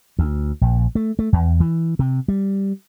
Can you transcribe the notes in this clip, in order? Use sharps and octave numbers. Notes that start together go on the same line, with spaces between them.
D2
A#1
A3
A3
E2
E3
C3
G3